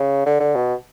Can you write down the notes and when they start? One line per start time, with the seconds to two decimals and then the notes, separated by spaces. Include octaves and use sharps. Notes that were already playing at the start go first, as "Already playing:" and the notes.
Already playing: C#3
0.26 D3
0.40 D3
0.55 B2